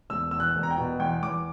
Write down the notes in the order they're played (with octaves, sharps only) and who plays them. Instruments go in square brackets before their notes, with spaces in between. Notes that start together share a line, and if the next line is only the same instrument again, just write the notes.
[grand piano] E1 E6
E2 E6
F#6
E1
A#5
G5
B2
E2 G5
E2 D6